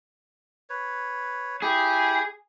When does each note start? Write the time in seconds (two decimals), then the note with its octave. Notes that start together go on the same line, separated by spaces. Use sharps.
0.70 B4 C#5
1.62 E4 G4 G#4